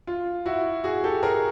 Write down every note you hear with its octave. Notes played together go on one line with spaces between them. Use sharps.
F4
E4 F#4
F#4 G#4
G4 A4
G#4 A#4